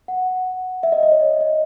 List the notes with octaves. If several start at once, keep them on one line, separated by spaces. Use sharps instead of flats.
F#5
E5
D#5
D#5
C#5
D#5
D#5